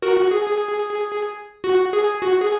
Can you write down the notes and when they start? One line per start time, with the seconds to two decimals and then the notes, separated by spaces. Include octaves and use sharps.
0.02 F#4 A#4
0.17 F#4
0.31 G#4
0.47 G#4
1.64 F#4
1.93 G#4
2.22 F#4
2.41 G#4